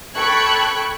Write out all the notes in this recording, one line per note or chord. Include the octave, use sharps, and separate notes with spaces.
A4 G5 B5 C#6 F#6 G#6